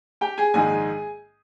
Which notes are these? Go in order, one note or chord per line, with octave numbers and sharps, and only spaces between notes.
G4 G5
G#4 G#5
A#1 G#2 D#3 G#3 G#4 G#5